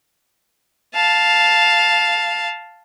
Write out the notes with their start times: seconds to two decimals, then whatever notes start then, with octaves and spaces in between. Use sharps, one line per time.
0.94 F5 A5